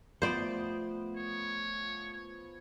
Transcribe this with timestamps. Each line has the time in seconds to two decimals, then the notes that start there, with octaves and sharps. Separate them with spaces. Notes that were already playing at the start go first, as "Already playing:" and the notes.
0.22 F3 A3 B3 C5 D5 D#6
1.16 C#5